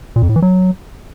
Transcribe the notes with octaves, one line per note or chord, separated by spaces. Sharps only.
A#2
F2
A2
E3
F#3